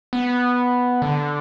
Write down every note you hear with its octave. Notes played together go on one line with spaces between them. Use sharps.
B3
D3